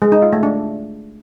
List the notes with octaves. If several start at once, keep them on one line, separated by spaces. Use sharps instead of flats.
G#3
D#4
F4
A3
D4